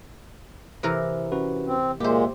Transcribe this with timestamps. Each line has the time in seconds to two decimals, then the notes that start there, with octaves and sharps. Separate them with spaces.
0.83 C3 E3 A#4
1.32 C#4 F#4 B4
1.66 C4
2.00 A#2 G#3 A#3 G4 C5 E5